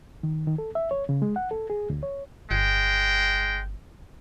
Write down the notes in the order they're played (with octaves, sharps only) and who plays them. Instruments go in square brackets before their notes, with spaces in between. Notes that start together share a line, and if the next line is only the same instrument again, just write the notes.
[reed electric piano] D#3
D#3
A4
E5
C#5
C#3
G#3
F#5
A4
G#4
D2
C#5
[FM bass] G1 [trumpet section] G#3 G5